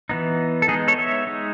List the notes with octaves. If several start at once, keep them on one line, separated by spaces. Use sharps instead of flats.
E3 B3 D#4
A4
G#3 B3 D#4 G#4
A4 C#5
C#5 E5
G#3 D#4